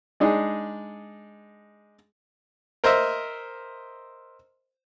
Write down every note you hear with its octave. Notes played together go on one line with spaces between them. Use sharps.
G#3 D4 D#4 G#4
A#4 C5 D#5 E5